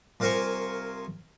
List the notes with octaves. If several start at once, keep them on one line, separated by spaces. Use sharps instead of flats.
C2 F4 A#4 C5 G#5 C#6